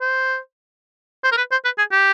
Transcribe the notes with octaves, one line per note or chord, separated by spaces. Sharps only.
C5
C5
A#4
B4
C5
B4
G#4
G4